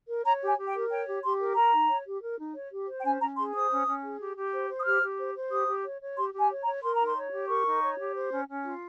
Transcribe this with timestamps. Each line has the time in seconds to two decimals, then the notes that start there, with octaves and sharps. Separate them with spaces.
0.09 A#4
0.25 C#5 A#5
0.42 G4 G#5
0.58 G4
0.68 G5
0.74 A#4
0.91 C#5 G5
1.08 G4
1.23 G4 C6
1.40 A#4
1.56 A#4 A#5
1.73 D#4
1.89 C#5
2.06 G4
2.22 A#4
2.39 D#4
2.55 C#5
2.71 G4
2.88 C5
2.99 G5
3.04 C#4 G#5
3.21 C#4 A#5
3.37 G#4 C6
3.54 C5 D#6
3.71 C#4
3.87 C#4
4.04 G#4
4.20 G4
4.37 G4
4.53 C5
4.70 C5
4.79 D#6
4.85 G4 F6
5.02 G4
5.19 C5
5.35 C5
5.52 G4 D#6
5.68 G4
5.84 C#5
6.01 C#5
6.17 G4 C6
6.34 G4
6.40 G#5
6.50 C#5
6.62 A#5
6.66 C#5
6.83 A#4 C6
6.95 A#5
7.00 D#4
7.06 C6
7.16 C#5
7.33 G4
7.49 A#4 C#6
7.66 D#4
7.82 C#5
7.98 G4
8.15 C5
8.32 C#4
8.48 C#4
8.64 F4